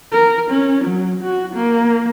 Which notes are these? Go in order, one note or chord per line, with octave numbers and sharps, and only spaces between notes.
A#4
C#4
F#3
F#4
A#3